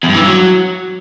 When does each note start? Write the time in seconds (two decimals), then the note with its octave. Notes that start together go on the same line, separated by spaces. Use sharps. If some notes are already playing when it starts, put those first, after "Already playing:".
0.03 E2
0.09 G2
0.14 E3
0.20 G2
0.26 F#3